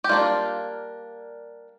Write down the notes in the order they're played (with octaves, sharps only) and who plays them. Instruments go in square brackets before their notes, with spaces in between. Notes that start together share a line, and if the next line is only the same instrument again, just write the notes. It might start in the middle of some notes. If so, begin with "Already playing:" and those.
[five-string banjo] G4
G3 A#3 D4 F4